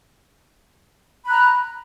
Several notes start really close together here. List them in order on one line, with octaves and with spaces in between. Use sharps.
B5 F#6 A#5